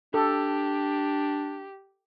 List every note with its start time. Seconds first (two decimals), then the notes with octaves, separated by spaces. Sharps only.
0.14 D4 G4 A4